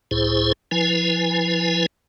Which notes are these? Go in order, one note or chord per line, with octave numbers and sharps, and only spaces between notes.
C#2 A2 E4 G#4 C5
F3 E4 B4 G#5